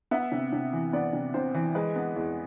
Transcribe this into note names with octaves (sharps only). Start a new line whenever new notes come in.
B3 E5
C3
C3
E3
B3 D5
C3
C3 C5
E3
G#3 B4
B3
E2